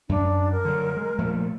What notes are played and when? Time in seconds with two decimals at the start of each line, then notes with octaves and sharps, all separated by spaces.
0.09 F#2 D4
0.52 A#4
0.65 D3 F#3
0.97 G#3
1.19 A#2 F3 A3